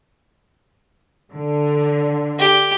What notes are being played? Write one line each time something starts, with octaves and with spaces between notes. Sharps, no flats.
D3
G4